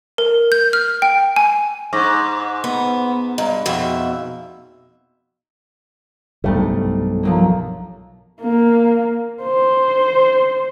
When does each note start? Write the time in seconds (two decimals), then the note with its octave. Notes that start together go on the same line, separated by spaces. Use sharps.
0.18 A#4
0.52 G6
0.73 F6
1.02 G5
1.36 G#5
1.93 G#2 C#6 D6 A#6
2.64 B3
3.38 G2 D#5 A#5
3.66 F2 B2 E5
6.44 B1 G2 C3 G3 A3
7.23 F3 F#3 A#3
8.41 A#3
9.43 C5